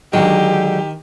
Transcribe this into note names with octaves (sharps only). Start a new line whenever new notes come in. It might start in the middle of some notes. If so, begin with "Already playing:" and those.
D3 D#3 F#3 G#3 G4